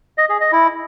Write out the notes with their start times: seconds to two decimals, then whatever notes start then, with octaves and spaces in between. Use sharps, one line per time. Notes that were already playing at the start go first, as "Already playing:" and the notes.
0.18 D#5
0.29 G#4
0.41 D#5
0.52 E4